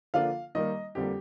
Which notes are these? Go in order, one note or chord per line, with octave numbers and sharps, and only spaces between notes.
D3 F3 A#3 D4 F4 F5
D#3 G3 A#3 D#4 D#5
F2 D3 G3 A#3 G4